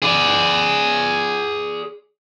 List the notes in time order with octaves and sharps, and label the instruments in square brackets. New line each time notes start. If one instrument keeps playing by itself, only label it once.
[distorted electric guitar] G#4 D5